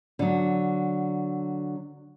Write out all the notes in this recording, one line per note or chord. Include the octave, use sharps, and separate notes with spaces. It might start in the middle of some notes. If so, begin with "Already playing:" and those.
D3 F#3